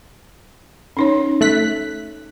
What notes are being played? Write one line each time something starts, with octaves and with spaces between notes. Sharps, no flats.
C#4 D#4 C#5
A3 F#6 B6